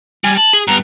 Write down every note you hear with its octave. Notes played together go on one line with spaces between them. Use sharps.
G3 G#5
A5 F#7
G#4
G2 B3 A#5